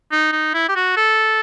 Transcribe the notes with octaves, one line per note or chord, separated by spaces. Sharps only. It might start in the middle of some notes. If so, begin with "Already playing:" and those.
D#4
D#4
E4
G4
F#4
A4